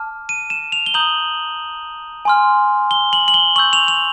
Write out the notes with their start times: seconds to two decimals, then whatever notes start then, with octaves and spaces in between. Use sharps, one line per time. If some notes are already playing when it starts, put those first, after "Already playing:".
Already playing: A5 D6 F6
0.29 D#7
0.50 E7
0.72 F7
0.86 G7
0.94 A#5 D#6 G6 F#7
2.25 G#5 C6 F6
2.91 G7
3.13 F#7
3.28 F#7
3.34 G7
3.56 C#6 E6 G6 F#7
3.73 F7
3.88 F7